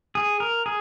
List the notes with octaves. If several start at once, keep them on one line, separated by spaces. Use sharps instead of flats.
G#4
A#4
G#4